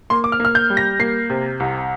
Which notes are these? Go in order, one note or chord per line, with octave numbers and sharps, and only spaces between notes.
A#3 C6
D6
F6
A#3
F6
G6
G3
A#6
A#3 C7
C3
C2